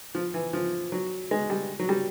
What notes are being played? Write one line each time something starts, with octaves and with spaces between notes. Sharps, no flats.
F3
E3
F3
F#3
G#3
G3
F#3
G3